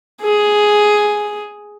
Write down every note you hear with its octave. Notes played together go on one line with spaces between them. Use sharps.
G#4